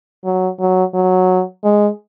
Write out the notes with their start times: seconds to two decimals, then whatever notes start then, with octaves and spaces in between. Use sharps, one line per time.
0.24 F#3
0.60 F#3
0.94 F#3
1.64 G#3